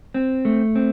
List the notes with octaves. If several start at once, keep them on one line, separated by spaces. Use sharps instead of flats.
C4
A3
C4